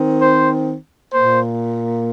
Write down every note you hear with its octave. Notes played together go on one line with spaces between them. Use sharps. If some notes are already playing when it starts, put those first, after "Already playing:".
Already playing: D#3 C4
C5
A#2 A#3 C5